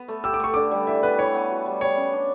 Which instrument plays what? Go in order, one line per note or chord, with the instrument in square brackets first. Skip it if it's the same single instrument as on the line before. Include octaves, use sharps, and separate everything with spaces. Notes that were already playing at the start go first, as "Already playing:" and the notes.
Already playing: [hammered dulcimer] B3
A3
[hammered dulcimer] G4 [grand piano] E6
[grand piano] D6
[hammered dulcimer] A3 [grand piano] C#6
[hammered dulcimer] D3 [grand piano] D6
[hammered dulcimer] G3
[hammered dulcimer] E3 [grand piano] E5
[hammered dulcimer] B3 [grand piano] B4
[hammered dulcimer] E3 [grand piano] C#5
[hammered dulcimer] B3
F#4
G3
[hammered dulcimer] G3 [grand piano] C#5
[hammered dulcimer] C#4
D4